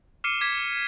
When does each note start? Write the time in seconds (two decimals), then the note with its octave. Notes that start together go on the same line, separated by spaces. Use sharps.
0.24 D6 F6 C7 C#7 D#7 E7
0.41 D6 G#6 B6